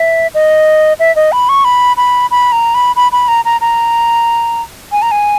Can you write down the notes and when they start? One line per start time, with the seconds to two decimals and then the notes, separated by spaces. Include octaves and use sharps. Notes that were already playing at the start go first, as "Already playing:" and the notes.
Already playing: E5
0.34 D#5
1.00 E5
1.16 D#5
1.32 B5
1.49 C#6
1.65 B5
1.97 B5
2.31 B5
2.52 A#5
2.75 B5
2.96 B5
3.12 B5
3.28 A#5
3.45 A#5
3.61 A#5
4.92 G#5
5.02 A#5
5.11 G#5